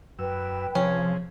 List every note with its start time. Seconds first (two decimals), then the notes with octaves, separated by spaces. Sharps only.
0.19 F#2 B4 G5 E6
0.75 C3 F3 C#4 G#4